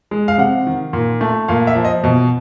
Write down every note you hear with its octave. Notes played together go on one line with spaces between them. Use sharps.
G#3
F5
C3 F#5
D#3
A#2
A3
A#2 F5
E5
F3
D#5
B2